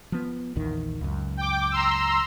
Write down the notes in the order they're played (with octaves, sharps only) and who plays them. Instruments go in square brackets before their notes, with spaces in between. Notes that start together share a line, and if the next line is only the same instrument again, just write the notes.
[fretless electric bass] F3 B3
A#1 E2 D#3
C#2 F#2
[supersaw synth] G5 D6
A#5 C6 E6